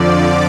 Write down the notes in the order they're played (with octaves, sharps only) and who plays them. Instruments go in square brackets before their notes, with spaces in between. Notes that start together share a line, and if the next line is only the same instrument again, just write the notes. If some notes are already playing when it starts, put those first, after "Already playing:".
Already playing: [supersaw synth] F2 D3 F3 D5